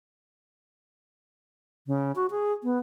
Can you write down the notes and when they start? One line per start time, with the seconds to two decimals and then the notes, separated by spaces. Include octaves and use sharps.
1.87 C#3
2.16 F#4
2.31 G#4
2.63 B3